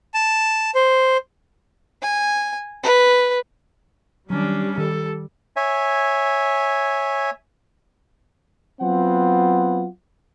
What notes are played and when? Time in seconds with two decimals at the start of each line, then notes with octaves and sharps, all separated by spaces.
0.14 A5
0.75 C5
2.02 G#5
2.84 B4
4.30 D#3 F#3 G3 C#4 D4
4.78 D#3 A4
5.56 C#5 E5 G#5
8.82 F#3 B3 C4 F4 F#5